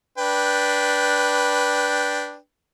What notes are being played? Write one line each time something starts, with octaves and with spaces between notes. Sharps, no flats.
D4 B4 G5